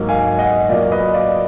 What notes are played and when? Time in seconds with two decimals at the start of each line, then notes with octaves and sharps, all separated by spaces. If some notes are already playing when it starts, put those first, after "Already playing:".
Already playing: G#2 F#3 A#3
0.09 F5 G#5
0.39 D#5 F#5
0.69 A#2 F#3 A#3 D5 F5
0.92 B4 D#5
1.14 D5 F5